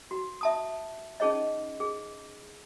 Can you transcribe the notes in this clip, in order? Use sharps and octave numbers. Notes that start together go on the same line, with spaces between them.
F#4
E5 A5 D#6
C#4 D#4 G#4 C#5 D#5
G#4